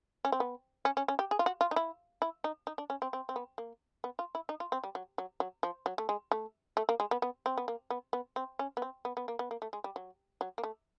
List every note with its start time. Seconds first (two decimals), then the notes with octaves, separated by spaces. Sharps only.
0.25 C#4
0.32 C4
0.40 B3
0.85 C#4
0.97 C#4
1.08 C#4
1.19 G4
1.31 G#4
1.39 F4
1.46 F#4
1.61 F4
1.71 D#4
1.76 E4
2.22 E4
2.44 D#4
2.67 D#4
2.78 D4
2.90 C#4
3.02 C4
3.13 C4
3.29 C4
3.36 B3
3.58 A#3
4.04 B3
4.19 F4
4.35 E4
4.49 D#4
4.60 F4
4.72 C4
4.84 G3
4.95 F#3
5.18 F#3
5.40 F#3
5.63 F3
5.86 F#3
5.98 A3
6.09 G#3
6.31 A3
6.77 A3
6.89 A#3
7.00 G#3
7.11 B3
7.22 B3
7.46 C4
7.57 B3
7.68 A#3
7.90 B3
8.13 B3
8.36 C4
8.59 C#4
8.77 B3
8.82 C4
9.05 B3
9.17 B3
9.28 A#3
9.39 B3
9.51 A#3
9.62 A3
9.73 G#3
9.84 G3
9.96 F#3
10.41 F#3
10.58 A#3
10.63 A3